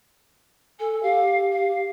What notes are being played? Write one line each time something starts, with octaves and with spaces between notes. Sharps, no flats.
A4 G#5
G4 F5
F5